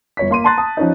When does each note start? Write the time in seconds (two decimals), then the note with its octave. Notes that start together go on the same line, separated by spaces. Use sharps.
0.17 G1 C#5 B6
0.31 A#3 C6 D#7
0.44 A5 A#5 C6 F#6 A6
0.58 A5 D#6
0.77 F3 C#4 D#4